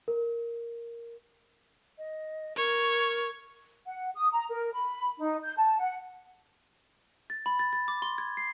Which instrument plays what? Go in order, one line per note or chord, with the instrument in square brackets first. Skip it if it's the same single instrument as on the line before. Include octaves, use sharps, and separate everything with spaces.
[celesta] A#4
[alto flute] D#5
[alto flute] A#4 [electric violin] C#5
[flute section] F#5
D#6
A#5
A#4
B5
D#4
G6
A5
F#5
[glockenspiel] A6
B5
A6
A6
D6
C6
G#6
C7